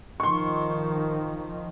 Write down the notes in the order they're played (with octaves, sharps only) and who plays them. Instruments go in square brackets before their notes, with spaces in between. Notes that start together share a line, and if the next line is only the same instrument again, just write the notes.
[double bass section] D#3 F3 [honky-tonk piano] C6 C#6